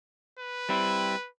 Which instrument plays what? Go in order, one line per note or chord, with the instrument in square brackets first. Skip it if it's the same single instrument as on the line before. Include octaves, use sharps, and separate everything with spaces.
[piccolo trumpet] B4
[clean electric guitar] G3 C4 E4